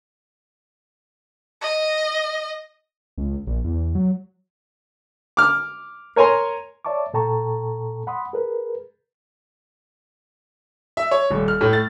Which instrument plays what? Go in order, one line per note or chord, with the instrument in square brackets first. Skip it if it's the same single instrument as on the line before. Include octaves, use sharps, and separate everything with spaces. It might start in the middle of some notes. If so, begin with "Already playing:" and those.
[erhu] D#5
[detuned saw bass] C#2
A#1
E2
F#3
[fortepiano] D6 F6
A#4 C#5 G#5 A#5 C6
[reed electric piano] C#5 D5 E5 A5 C#6 D6
A#2 A4 G5 A5 A#5 C#6
F#5 B5 C6 D#6
G#4 A#4 B4
[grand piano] E5
C#5
D#1
F6
A2
A6